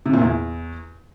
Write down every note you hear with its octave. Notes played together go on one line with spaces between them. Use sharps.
C3
A#2
E2